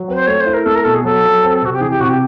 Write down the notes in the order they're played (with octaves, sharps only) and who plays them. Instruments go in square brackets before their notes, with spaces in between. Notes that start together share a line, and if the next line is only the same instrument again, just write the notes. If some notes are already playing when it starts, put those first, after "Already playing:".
Already playing: [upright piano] F#3
[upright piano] C4 [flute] B4
[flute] C5
[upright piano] A3 [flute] C#5
[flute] C5
[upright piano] E4
[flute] A#4
[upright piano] A3 [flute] A4
[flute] A#4
[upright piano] B2 [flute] A4
[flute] G#4
[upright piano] F#3 [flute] A4
[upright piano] F#3
C4
[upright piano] C3 [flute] F#4
[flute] G4
[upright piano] E3 [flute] G#4
[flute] G4
[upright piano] C3 [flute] F#4
[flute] G4